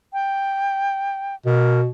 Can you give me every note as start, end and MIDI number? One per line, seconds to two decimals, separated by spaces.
0.13 1.35 79
1.46 1.88 47
1.46 1.80 70